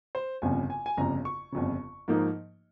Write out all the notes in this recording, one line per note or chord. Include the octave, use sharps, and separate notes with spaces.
C5
G1 F2 C#3 G#5
G#5
G#5
G1 F2 C#3 A#5
C#6
G1 F2 C#3
G#2 F3 A#3 D#4